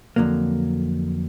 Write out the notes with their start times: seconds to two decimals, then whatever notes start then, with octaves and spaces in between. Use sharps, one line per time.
0.16 F2 D3 F#3 A#3